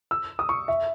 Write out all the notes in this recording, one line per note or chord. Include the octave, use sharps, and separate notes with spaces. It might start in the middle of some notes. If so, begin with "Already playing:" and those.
E6
D#6
C#6
E5